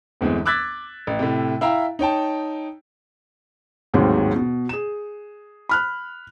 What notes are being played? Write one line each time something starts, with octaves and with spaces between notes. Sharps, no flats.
G1 E2 G#3 C4
D6 E6 F#6 G#6 A6 B6
A1
A2 C3
E4 E5 F5 G5 A#5
D#4 C#5 G5 A5
A1 D#2 G#2 C3 D#3 F#3
B2
G#4 E7
B5 F6 F#6